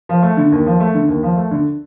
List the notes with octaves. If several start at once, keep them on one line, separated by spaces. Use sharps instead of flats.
F3
A3
D3
D#2
F3
A3
D3
D#2
F3
A3
D3